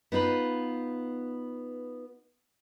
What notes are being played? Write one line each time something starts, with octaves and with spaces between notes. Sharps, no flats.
B3 D#4 F4 B4